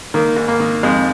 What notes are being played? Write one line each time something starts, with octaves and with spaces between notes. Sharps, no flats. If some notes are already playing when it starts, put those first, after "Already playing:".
D#3 A#3
G#2
A#3
D#3
F2 G#3